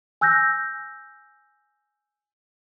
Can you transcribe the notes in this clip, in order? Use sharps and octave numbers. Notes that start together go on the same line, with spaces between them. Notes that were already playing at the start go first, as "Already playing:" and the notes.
G#5 E6 F#6 G6 A#6